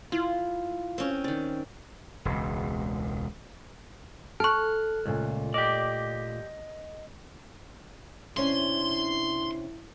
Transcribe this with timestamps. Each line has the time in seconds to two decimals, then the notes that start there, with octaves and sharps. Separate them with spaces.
0.12 E4 F4
0.98 C4 C#4
1.24 D#3 D5
2.25 E1 C#2
4.40 A4 A5 C#6 F6 F#6
5.06 C#2 A#2 A3
5.54 G4 D5 D#5
8.37 C3 C#4 D4 E4 C6